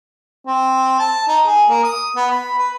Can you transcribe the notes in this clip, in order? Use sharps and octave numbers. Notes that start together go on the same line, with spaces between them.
C4
A5
D#4
G#4
A#3
D#6
B3
B5
B4